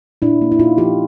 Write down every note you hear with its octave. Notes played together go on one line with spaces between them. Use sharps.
A#2 D4 E4
A#3
E4
A#2 D#4 F4
F3 F4 G4